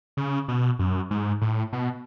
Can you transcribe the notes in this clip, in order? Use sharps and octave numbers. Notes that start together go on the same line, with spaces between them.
C#3
B2
F#2
G#2
A2
B2